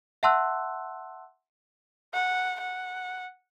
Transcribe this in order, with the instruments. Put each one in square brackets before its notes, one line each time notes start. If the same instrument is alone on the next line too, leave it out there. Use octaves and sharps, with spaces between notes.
[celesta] E5 F#5 A5 C6 E6 F#6
[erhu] F#5
F#5